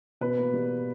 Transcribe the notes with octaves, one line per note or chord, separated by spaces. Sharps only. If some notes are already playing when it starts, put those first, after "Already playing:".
B2 B4
A#3
G3